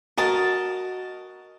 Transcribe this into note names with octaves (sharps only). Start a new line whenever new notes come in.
F#4 A#4 D#5 A5